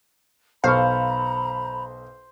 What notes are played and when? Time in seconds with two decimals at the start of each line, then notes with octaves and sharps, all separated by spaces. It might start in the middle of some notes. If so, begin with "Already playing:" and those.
0.64 B1 A4 C5 F5 A#5 B5 C#6